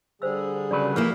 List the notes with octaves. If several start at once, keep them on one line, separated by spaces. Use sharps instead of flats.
D3 G3 G#4 C5 E6
C#3 F#3 B4 D5
E3 F3 A#3 E4